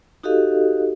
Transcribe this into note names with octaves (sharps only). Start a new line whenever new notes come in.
D#4 F#4 G4 A4 D#5 F5